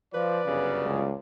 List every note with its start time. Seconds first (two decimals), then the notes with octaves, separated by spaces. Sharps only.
0.14 F3 B4 D5
0.45 G1 F#2 C#3
0.84 C#2